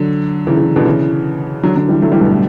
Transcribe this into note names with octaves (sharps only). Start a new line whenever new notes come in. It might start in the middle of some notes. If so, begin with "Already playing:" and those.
Already playing: D3 F#3
C#3 E3
C#3 E3
B2 D3
C#3 E3
D3 F#3
D3 F#3
E3 G3
F#3 A3
E3 G3
G2 B2
A2